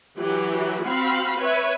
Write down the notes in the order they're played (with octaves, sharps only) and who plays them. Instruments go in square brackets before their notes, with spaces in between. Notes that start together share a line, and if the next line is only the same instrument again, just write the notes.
[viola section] E3 F#3 F#4 G4
C4 F#4 F5 B5
B4 C#5 E5